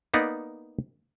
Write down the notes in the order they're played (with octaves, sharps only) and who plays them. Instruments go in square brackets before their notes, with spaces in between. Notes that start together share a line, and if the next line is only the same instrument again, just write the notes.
[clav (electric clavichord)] A#3 B3 D#4 D5